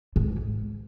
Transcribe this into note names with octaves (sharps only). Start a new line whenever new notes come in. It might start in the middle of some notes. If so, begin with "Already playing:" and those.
G#2